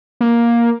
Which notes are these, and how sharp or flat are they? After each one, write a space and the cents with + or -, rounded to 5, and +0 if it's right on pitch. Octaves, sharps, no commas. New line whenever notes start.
A#3 +10